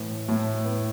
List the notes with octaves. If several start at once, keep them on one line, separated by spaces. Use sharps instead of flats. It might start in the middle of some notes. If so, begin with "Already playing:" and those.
Already playing: A2 E3
A2
B3